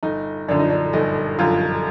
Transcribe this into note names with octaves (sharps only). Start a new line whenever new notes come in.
G1 D#4
F#2 D3 F3 D4
D#4
D4
G1 D#4
F#2 D3 F3 F4